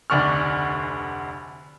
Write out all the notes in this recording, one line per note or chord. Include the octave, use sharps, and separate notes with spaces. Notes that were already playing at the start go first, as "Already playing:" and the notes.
F1 D2 D4 C#6 F6